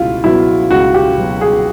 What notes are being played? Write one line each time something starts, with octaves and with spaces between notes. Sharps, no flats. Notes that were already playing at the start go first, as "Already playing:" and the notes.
Already playing: C#2 B2 E4 F4
B2 F#3 E4
C#2 F#4
G4
B2 F#3
G#4